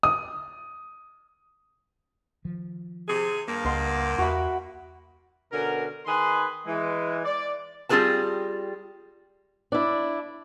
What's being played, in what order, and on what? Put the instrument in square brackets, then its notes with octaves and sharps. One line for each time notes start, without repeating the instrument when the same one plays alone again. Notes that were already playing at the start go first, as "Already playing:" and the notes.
[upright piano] D#6
[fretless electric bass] D#3 F3
[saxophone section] C3 G#4
G2 A#3
[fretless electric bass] C#2 [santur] D#5 F#5 C6
[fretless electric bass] E2 [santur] F#4 E5 B5
[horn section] B2 D3 C#4 F#4 A#4
D#3 G#4 B4 G#5 B5 C6
E3 G#3
D5
[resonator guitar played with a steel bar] G3 C4 F4 G#4 B4 A5
[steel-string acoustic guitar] D4 E4